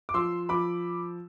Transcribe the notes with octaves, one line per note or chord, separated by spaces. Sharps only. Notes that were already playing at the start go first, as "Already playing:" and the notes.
D6
F3 C6 E6
F3 B5 D6